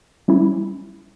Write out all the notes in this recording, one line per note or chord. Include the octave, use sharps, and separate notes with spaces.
G3 C#4 E4